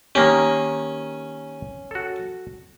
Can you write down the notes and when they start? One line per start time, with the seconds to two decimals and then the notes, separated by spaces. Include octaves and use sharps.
0.15 D#3 A#3 C#4 G4
1.91 F#4 A4